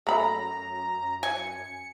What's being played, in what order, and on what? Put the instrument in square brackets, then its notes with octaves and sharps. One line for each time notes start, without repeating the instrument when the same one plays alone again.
[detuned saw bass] F#2 [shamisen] A3 B5 [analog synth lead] A#5
[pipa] G#5 [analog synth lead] C#7